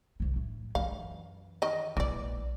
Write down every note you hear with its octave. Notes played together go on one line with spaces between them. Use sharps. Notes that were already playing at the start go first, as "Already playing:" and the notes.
C2 D#3
A2
F#2 E3 F5
D#3 D#5
A#1 E3 G#3 D5